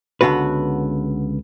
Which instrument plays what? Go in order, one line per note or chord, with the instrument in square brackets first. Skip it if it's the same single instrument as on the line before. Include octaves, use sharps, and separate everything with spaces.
[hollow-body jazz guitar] C#2 D3 B3 F#4 B4